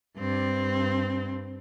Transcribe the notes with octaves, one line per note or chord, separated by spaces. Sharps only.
G2 C4